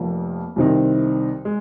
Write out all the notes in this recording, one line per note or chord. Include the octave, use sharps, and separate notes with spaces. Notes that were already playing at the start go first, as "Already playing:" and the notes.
Already playing: F1 F2 F3 A#3
C2 C3 D#3 C4 D#4
G#3